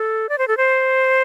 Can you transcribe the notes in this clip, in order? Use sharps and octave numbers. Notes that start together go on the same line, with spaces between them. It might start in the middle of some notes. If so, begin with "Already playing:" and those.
Already playing: A4
D5
C5
A4
C5